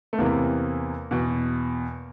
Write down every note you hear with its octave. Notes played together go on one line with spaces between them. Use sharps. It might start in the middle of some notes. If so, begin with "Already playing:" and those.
A3
E2 C3 E3 A#3
E2 B2